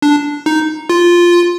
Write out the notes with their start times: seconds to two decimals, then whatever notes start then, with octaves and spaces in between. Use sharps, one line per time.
0.02 D4
0.46 D#4
0.89 F4